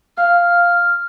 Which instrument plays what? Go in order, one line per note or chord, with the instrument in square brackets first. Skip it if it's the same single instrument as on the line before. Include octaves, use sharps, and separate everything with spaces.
[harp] F5 [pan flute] F6